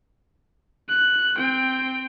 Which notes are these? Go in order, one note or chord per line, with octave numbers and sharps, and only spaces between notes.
F#6
C4 G5